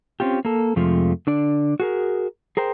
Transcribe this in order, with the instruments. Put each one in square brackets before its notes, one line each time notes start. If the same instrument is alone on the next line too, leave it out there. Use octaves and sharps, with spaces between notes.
[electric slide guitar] C4 C#4 F4 G4
A#3 A4
F2 C3 F3 G#3 A3 F4
D3 D4 D5
F#4 G#4 A#4
G#4 A#4 C5 G5